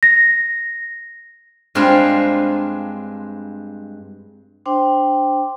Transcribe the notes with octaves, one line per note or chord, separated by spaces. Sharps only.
A#6
G2 G#3 C4 D4 F4
D4 C5 G5 C6 D6